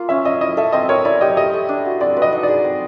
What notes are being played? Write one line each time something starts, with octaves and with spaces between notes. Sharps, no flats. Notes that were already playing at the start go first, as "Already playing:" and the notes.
Already playing: A#3 F4
C#4 E5
C#4 D#5
E4 D#5
A4 E5
C4 D#5
A#4 C#5
E4 D5
G4 D#5
A3 D#5
A3
D4
F#4
C4 D5
B4
D#5
D#4
G#4 D5
C4